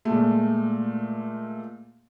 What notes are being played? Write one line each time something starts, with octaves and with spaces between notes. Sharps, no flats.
A#2 G#3 A3